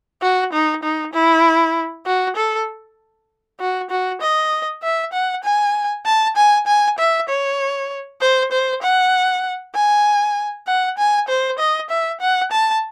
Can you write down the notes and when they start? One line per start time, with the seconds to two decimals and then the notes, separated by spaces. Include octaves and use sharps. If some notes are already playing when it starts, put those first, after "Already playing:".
0.22 F#4
0.52 D#4
0.83 D#4
1.13 E4
2.06 F#4
2.36 A4
3.60 F#4
3.90 F#4
4.21 D#5
4.83 E5
5.13 F#5
5.44 G#5
6.05 A5
6.36 G#5
6.67 G#5
6.98 E5
7.29 C#5
8.21 C5
8.52 C5
8.82 F#5
9.75 G#5
10.67 F#5
10.98 G#5
11.28 C5
11.59 D#5
11.90 E5
12.21 F#5
12.52 A5